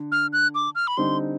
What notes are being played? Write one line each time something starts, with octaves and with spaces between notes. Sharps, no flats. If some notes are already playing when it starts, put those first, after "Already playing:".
Already playing: D3
F6
F#6
D6
F6
B5
D3 G3 C4 D#4 C6